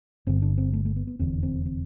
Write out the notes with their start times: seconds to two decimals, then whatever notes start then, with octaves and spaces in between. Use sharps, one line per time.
0.27 G1 G2 D3 C4
0.42 D4
0.58 C4
0.73 A3
0.85 A3
0.96 B3
1.07 B3
1.19 F1 E2 D3 C4
1.43 C4
1.66 C4